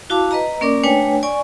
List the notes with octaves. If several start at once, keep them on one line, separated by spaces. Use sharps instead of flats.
E4 F#4 F5 A5 D6
B4 D#5 A#5
A#3 C#4 A#4 D5 D6
A3 D4 B4 C#5 G5 G#5
D5 G#5 C#6